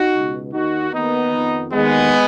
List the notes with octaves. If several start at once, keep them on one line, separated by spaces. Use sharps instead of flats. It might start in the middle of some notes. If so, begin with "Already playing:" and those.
Already playing: D#4 F#4
C#2 B2
D#2 D#3 D#4 F#4
D#2 D#3 B3 D#4
F2 D#3
D#2 D#3 G#3 B3